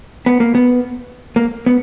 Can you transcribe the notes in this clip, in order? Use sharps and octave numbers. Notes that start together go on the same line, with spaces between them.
B3
A#3
B3
A#3
B3